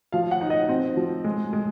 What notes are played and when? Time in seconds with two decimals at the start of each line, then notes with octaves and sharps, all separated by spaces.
0.12 F3 F5
0.31 F#5
0.41 D#4
0.50 D#5
0.69 C4
0.97 F3
1.24 G#3
1.53 G#3